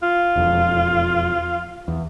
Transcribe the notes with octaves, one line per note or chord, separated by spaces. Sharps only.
F4
E1 F2
E2